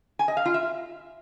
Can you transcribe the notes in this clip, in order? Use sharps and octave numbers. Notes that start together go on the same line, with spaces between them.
G#5
D#5
F5
F4
E5